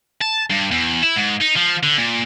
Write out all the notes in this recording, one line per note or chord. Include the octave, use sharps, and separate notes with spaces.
A5
G2
E2
E4
G#2
D#4
F3
D3
A#2